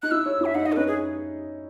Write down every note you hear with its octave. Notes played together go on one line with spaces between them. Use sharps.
D#4 F#6
E4 E6
C#5
E4 E5
D#4 F#5
D#5
A4
C#4 B4
G#4